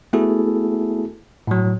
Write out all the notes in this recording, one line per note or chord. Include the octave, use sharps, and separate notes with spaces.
A3 B3 E4 F#4 G#4 A4
A2 F#3